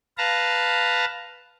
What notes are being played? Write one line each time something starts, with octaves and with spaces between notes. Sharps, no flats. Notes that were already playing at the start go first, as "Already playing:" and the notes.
B4 F5 A5 A#5